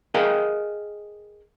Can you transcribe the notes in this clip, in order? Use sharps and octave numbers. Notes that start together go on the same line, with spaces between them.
G#4 A#4 D#5 F5 G5